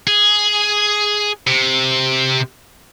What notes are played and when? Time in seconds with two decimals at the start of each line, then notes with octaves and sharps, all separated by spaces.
0.07 G#4
1.47 C3